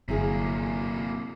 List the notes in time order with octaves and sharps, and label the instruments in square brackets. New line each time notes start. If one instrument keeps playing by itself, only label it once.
[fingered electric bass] G1 [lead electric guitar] C3 A#3 [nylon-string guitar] F#3 E4 G#4